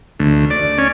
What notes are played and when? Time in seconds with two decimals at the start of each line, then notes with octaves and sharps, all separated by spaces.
0.19 D2
0.50 D5
0.78 C#4